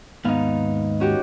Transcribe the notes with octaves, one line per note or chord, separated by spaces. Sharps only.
D#2 G#2 B3 D#4 F5
C#4 F#4 G4